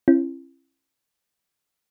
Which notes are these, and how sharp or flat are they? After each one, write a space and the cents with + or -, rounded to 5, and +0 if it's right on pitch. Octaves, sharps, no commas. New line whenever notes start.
C#4 -40 E4 +30